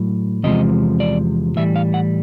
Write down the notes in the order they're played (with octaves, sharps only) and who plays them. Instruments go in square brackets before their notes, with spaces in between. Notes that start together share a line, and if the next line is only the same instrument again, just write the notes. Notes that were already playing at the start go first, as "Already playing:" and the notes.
Already playing: [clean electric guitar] A2 F#3
E2 C3 F3 G#3 D#5
D5
A2 E3 G3 E5
F5
F#5